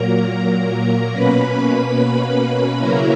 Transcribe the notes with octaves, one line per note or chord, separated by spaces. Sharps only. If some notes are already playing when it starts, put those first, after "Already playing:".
Already playing: A#2 F#3 A#3 A#4 A#5
B2 A#3 C#4 B4 B5
C#3 F#3 A#3 C#4 E4 A#4 A#5